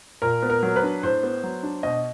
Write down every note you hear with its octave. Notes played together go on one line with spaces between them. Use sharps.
A#2 A#4
B3
A#4
F#3
B4
D4
A2 C5
B3
F#3
D4
B2 D#5